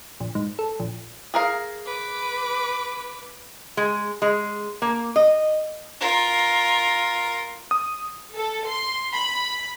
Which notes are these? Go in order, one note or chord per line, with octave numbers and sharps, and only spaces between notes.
A#1
G#2
A4
A#1
G#4 A#4 F5
B4 D6
G#3
G#3
A#3
D#5
F4 A#4
D#6
A4
C6
B5